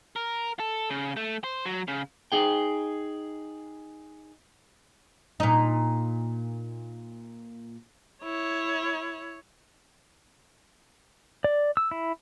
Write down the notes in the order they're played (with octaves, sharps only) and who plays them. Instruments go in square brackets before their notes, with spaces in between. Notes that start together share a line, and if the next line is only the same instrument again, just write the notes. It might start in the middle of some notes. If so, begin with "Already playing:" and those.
[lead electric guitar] A#4
A4
C#3
A3
C5
F#3
C#3
[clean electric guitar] D#4 G#4 G5
[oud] A#2 D#4
[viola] E4 C#5
[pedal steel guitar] D5
E6
E4